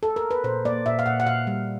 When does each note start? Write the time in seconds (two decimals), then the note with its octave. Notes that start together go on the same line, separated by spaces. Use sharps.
0.03 A4
0.16 A#4
0.31 B4
0.44 A#2 C5
0.65 A#3 D5
0.86 A#2 E5
0.99 F5
1.06 A#2 F#5
1.20 F#5
1.26 A#2 F5
1.47 G3